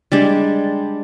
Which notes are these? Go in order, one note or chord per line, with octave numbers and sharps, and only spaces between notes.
G3 G#3 D4